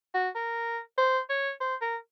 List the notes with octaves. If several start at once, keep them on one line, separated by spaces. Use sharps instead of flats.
F#4
A#4
C5
C#5
C5
A#4